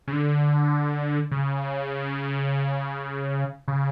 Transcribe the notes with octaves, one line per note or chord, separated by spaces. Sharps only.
C#3
D3
C#3
C#3